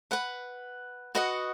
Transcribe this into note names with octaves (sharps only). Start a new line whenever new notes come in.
B4 F#5 B5
F#4 B4 D#5 F#5